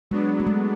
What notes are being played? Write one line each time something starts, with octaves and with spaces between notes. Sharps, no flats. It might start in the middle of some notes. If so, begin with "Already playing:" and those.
F#3 G#3 B3 D4
A3
G#3